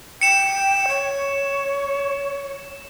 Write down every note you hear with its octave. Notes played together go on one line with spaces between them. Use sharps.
G5 C#7 E7
C#5